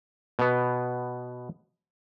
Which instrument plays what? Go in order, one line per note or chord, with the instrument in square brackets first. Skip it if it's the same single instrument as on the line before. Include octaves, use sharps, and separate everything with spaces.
[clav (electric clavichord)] B2 B3